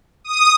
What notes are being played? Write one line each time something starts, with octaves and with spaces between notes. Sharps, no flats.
D#6